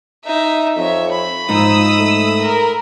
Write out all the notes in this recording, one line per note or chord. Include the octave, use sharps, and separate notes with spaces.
D#4 E5
F2 C#5 E5
B5
G#2 F3 D#4 D#6 E6
A3
A#4